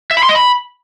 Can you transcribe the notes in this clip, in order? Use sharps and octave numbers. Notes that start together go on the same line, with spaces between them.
E5
B5
C6
D#5
B5